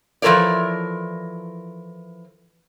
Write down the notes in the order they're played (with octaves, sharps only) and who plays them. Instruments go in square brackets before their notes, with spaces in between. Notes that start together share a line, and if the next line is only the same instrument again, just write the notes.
[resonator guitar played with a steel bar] E3 F3 A4 A#4 C#5 D5